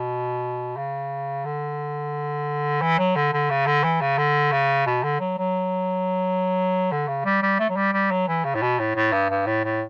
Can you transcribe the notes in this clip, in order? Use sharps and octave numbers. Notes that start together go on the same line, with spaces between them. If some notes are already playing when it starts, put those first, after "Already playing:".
Already playing: B2
C#3
D3
E3
F#3
D3
D3
C#3
D3
E3
C#3
D3
C#3
B2
D3
F#3
F#3
D3
C#3
G3
G3
A3
F#3
G3
G3
F#3
E3
C#3
A2
B2
A2
A2
G2
G2
A2
A2